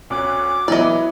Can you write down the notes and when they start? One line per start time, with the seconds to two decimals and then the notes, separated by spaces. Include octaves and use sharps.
0.10 D2 C#4 D6 F#6
0.68 E3 F#3 B3 E4 D5 D#5